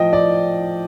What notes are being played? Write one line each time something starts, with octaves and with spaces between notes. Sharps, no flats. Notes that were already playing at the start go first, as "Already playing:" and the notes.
Already playing: A2 F3 D#5 G5
D5